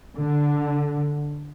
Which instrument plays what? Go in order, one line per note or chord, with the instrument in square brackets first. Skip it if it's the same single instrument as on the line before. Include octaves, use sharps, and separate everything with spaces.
[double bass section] D3